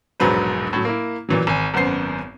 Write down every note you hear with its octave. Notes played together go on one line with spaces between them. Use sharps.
E1 A#1 G#2 F#3 B4 C5
A2 F#3
A#3 E4
A#2 E3 F#3
G#1 G#5
G#1 F#2 B3 C5 C7